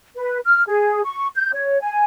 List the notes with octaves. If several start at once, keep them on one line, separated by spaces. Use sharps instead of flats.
B4
F6
G#4
C#6
G6
C#5
G#5